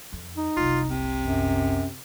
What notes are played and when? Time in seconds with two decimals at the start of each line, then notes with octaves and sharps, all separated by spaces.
0.13 F2
0.37 D#4
0.57 F#1 C2 F4
0.90 C3
1.22 F#2